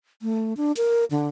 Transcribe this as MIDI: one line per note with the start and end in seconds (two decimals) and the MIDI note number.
0.22 0.54 57
0.57 0.72 62
0.77 1.05 70
1.11 1.28 50